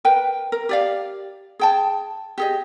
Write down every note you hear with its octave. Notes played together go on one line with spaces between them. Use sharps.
A#4 B4 G5
A#4
G4 D5 F5
G#4 G5 A5
G4 G#4 D#5